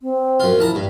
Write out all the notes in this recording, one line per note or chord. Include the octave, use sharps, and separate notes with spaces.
C4
F#2 F4
A#1 E4 A5 A#5
G2